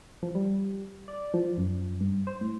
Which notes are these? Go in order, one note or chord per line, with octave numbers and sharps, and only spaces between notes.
F3
G3
D5
F3
F#2
G2
C5
A2